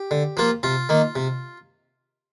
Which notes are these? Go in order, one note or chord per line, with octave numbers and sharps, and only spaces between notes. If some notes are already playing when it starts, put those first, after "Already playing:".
Already playing: G4
D3
F3 A#3 F4
C3 F4
D#3 A#3
C3